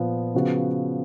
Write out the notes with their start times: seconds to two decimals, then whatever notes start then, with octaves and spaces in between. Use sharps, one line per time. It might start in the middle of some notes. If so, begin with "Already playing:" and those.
Already playing: A#2 F3 B3
0.34 C#3 F3 B3 F#4